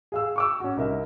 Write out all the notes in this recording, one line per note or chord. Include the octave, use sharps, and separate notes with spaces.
G#4 F5 E6
C#6 D6 E6
C#4 F#4
C2 D#4 A#4 E5